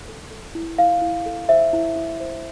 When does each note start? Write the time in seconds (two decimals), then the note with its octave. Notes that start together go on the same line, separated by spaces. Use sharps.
0.09 A4
0.31 A4
0.55 E4
0.78 E4 F5
1.02 E4
1.26 A4
1.48 C5 E5
1.73 E4
1.96 E4
2.20 C5